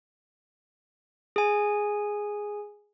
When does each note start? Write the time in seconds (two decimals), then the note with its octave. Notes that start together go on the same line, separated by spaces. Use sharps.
1.36 G#4 G#5